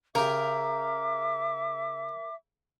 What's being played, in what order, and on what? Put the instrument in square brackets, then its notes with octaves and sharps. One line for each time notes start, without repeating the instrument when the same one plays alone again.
[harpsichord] C#3 G4 [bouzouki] A#4 [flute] E5 [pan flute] D6